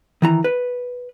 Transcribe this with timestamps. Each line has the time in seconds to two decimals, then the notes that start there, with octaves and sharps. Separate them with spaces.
0.22 D#3 E3 A#5
0.44 B4